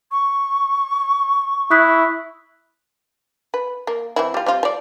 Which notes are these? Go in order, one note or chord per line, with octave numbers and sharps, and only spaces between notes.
C#6
E4 D#6 F#6 B6
B4
A#3
E3 C4 E4
G3 F4
G3 C4 F4
F3 D5